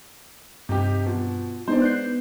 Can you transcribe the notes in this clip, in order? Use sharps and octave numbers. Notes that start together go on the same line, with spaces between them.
G2 C3 D#4 G4
B2 F3
G#3 B3 D4 D#4 C5 D5
F#6 G6 C7